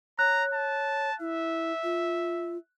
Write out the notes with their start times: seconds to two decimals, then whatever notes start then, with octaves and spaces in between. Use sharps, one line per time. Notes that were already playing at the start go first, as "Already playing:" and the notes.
0.19 C#5 A#5 F#6
0.54 A5
1.20 E4 E5
1.83 F4